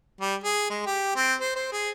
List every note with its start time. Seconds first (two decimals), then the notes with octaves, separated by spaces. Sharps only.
0.21 G3
0.44 G#4
0.70 G#3
0.86 G4
1.16 C4
1.41 C5
1.56 C5
1.72 G#4